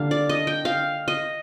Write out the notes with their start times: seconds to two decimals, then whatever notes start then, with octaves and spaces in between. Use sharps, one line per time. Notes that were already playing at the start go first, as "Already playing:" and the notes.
Already playing: D3 G3 A#3 D4 F5
0.11 D5
0.29 D#5
0.47 G5
0.65 F5
1.08 D#5